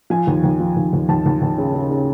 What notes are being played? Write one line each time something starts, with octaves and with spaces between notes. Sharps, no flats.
F3 G#5
D#2
D#2
F3
D#2
D#2
D#2 A5
D#2
D#2
C#3
C#3
C#3